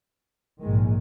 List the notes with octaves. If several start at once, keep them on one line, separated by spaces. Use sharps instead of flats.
A#1 G#2 D#3 G#3